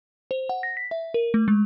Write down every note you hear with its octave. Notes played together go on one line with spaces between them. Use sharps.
C5
F#5
A#6
B6
E5
A#4
A3
G#3